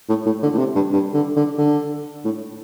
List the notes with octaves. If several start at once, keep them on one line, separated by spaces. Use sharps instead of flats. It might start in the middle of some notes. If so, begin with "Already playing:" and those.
A2
A2
D3
A2
C3
G2
G2
D3
D3
D3
A2